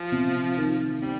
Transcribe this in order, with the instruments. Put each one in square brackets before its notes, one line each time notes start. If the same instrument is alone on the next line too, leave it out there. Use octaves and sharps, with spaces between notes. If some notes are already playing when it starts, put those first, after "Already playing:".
Already playing: [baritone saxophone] F3
[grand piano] C3
D#3
[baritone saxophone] G3 [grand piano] C4